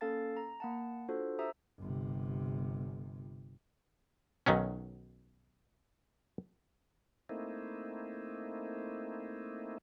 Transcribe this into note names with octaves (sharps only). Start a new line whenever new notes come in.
A#3 C#4 A4 F5 A5 A6
A#5
A#3 F#5 A5
D4 F4 F#4 A4 C5
G4 C5 E5 A#5 D#6 E6
G1 C3
B1 D#3 F#3 C#4
A3 A#3 C4 D#4 E4